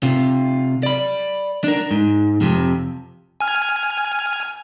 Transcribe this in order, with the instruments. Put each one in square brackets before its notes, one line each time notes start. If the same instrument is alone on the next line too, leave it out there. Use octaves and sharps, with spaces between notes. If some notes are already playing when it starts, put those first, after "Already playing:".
[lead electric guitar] C3 F4
D5 B5
D4 A#4
G#2
F2 C3
[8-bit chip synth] G#5 F6